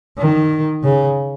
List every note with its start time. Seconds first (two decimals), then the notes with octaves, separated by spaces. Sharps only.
0.19 D#3
0.83 C#3